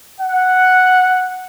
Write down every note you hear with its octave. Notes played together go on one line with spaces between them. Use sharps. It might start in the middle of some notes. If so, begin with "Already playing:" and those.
F#5